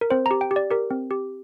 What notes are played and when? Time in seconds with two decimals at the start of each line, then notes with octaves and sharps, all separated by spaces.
0.01 A#4
0.10 C4 C5
0.26 A#5
0.31 G4
0.41 G5
0.51 G4
0.56 D5
0.71 G4 A#4
0.91 C4
1.11 G4